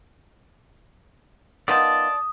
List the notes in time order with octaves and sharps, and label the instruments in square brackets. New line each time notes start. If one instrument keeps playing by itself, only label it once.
[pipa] D#3 B3 F4 [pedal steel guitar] D5 A5 [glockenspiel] D#6